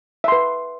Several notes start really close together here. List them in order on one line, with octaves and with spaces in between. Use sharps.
E5 C6 B4